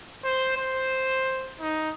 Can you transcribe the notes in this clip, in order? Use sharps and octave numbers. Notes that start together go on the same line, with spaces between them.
C5
C5
D#4